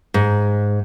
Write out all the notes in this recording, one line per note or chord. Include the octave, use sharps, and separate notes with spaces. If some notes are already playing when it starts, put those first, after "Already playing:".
G#2